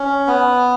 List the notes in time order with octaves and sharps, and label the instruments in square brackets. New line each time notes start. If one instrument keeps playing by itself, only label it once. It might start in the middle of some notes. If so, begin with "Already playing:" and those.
Already playing: [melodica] C#4
B3